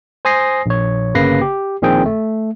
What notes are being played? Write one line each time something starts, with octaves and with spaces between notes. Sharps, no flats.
C5 G#5 D#6 A#6 C7
A#1 C#5
G1 C#3 A#3 B4 A#6 C7
G4
A#1 A#2 D#3 C4 G#4 G5
A3